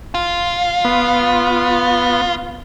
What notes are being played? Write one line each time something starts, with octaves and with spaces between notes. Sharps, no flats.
F4
B3